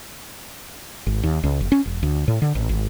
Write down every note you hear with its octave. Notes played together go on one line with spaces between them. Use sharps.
G#1
D#2
C#2
F#1
C#4
E1
D2
A2
D3
A1
G#1